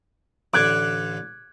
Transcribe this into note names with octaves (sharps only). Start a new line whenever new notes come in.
A1 D3 D6 F#6 G#6